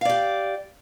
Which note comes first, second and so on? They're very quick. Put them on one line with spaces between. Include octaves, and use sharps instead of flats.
F5 D5 G4